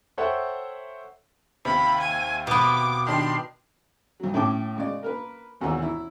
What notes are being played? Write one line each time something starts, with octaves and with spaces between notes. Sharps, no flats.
A4 C5 C#5 E5 F#5 G5
D#2 C3 B5
G#5
B2 B3 D6
D#3 D4 G4 C6
C2 F#3
A2 C#4 G5 A5 D6
C#3 G#3 D5
A#3 A#4 B4
G#1 D#2 B2 E3 F#5 E6
E4